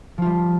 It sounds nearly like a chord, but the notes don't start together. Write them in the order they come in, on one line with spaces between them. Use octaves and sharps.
F3 F4 G3